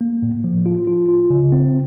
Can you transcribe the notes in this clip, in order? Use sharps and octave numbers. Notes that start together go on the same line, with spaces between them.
A#3
A2
F3
F4
F4
F4
C#3
C4